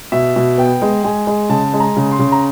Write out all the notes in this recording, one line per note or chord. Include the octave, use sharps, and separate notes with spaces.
B2 E5
B2
B3 G5
G#3
G#3 G#5
G#3
C#3 A5
G#3
A#5
C#3
C6
C#3
A#5